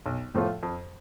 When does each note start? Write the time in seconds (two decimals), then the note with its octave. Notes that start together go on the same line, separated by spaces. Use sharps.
0.06 B1
0.34 A2 F3 A3 F4
0.63 F2